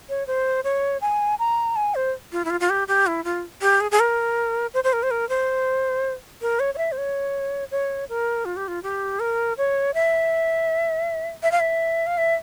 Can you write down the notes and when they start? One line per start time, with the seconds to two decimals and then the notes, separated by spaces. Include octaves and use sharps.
0.09 C#5
0.27 C5
0.64 C#5
1.01 G#5
1.39 A#5
1.76 G#5
1.95 C5
2.32 F4
2.45 E4
2.50 F4
2.60 F4
2.70 G4
2.88 G4
3.07 E4
3.24 F4
3.62 G4
3.81 G#4
3.91 G#4
4.00 A#4
4.74 C5
4.84 C5
4.93 A#4
5.03 C5
5.11 A#4
5.29 C5
6.42 A#4
6.60 C#5
6.74 C#5
6.78 E5
6.92 C5
6.98 C#5
7.71 C#5
8.09 A#4
8.45 F4
8.56 G4
8.68 F4
8.83 G4
9.20 A#4
9.58 C#5
9.94 E5
11.43 E5
11.52 F5
11.60 E5
12.07 F5
12.18 E5